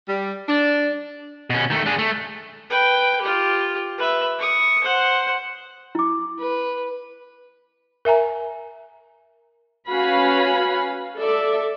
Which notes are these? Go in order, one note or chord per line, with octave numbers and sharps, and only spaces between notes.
G3
D4
B2 C#4
D#3 A3
D4 G#4
A3
B4 G5
F4 G4
B4 E5
C#6 D#6
C5 F#5
E4 D6
B4
A#4 E5 G#5 A#5
C#4 F#4 B4 F5 G#5 B5
A4 D5 E5